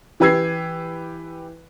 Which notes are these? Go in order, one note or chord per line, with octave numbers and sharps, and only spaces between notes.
E3 G4 B4 E6 G#6 C7